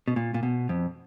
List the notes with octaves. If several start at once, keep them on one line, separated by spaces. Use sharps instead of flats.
B2
A#2
A#2
B2
F2